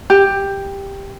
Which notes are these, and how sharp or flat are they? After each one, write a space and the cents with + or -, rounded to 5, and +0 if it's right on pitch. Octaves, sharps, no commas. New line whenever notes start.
G4 +10